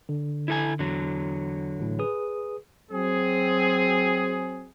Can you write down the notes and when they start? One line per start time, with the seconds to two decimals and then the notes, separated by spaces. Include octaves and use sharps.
0.09 D3
0.48 E4 A4 G#5
0.79 E2 D3 F#3
1.79 A1 A2
1.99 G#4 B4 D#6
2.92 F#3 C4 G#4